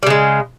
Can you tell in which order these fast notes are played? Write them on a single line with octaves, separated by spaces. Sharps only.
G3 C#3 G#3